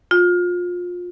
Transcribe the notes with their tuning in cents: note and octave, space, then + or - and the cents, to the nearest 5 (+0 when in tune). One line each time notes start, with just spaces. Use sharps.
F4 +25